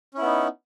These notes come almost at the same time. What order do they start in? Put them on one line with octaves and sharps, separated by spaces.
C#4 E4 B3 D#4